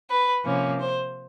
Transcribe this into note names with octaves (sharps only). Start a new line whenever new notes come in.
B4
C3 F3 A#3 C#4
C5